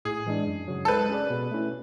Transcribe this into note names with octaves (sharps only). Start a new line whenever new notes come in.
A2 G#4
E3 G#3 D4
F#2
C#3 F#3
A4
G#3 B4
C#4 G#4 D5
B2
A3 C#4 E4